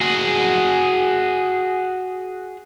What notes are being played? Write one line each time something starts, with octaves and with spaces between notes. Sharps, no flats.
F#4 G#4